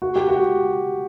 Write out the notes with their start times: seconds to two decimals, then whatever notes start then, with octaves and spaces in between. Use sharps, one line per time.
0.02 F#4
0.16 G4
0.29 F#4